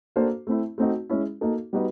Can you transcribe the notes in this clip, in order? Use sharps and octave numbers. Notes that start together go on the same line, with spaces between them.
A#3 D4 F#4 A4 C5
A3 C4 E4
A3 C4 D#4 F#4
G#3 C#4 E4
A#3 D#4 F#4 A4
G3 B3 D#4 F#4 B4